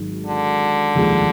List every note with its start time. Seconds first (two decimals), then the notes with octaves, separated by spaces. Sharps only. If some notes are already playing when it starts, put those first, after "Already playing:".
Already playing: G#1 G#2 D#3 F#3
0.27 D3
0.95 F1 D#2 C#3 F3 G#3